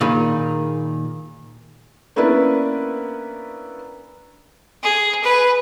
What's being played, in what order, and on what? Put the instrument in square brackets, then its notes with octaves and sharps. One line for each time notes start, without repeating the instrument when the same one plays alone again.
[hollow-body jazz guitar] A#2 D#3 G#4 B5
[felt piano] A#3 B3 C#4 D4 E4 B4
[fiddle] G#4
B4